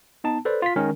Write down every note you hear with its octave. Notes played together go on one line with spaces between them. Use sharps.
B3 D#4 A5
A4 B4 C5 D5
F4 B6
D#3 G#3 C#4 A#4